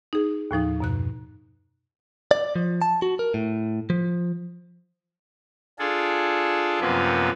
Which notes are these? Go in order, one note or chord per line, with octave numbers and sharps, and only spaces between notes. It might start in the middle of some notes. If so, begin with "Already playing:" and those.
D#4 G#4
D#2 A2 F3 D#4
F#2 B2 F#6
D5
F3
A5
F#4
A#4
A2
F3
D4 F4 G#4 A4
F#2 C3 F3 A#3 B3 B4